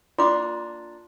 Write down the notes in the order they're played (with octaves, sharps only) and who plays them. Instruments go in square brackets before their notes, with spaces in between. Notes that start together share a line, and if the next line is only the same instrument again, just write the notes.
[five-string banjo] A#3 D4 [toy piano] F4 D6 [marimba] C6